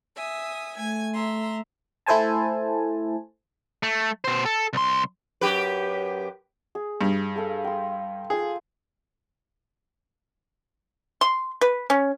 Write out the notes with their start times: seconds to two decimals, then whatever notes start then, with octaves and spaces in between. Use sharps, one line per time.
0.16 E5 G#5 D#6
0.77 A3 G#5 G#6
1.14 E5 A#5 C6
2.06 A3 E4 A4 C5 G#5 A5
3.83 A3
4.24 B2 C5
4.45 A4
4.73 C2 C6
5.41 F#2 G4 B4
6.75 G#4
7.01 G2
7.36 G#4 A4 F5
7.64 G5 C6
8.30 F4 G#4 G5
11.21 C6
11.61 B4
11.90 C#4